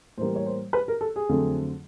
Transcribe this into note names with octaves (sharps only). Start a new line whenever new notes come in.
A2 E3 G3 A#3 C5
C#5
C5
B4
A#4
A4
G#4
F2 D3 F#3 A3 C4